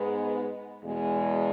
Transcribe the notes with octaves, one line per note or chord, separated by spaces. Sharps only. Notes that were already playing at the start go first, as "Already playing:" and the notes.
Already playing: G#2 G#3 B3
E2 B2 G#3